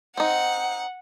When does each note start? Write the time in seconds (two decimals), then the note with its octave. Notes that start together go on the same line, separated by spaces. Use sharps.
0.17 C4 D#4 F#5